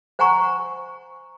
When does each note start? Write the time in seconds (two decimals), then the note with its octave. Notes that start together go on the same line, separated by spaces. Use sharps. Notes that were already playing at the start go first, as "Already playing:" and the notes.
0.19 C5 F#5 G#5 A#5 C#6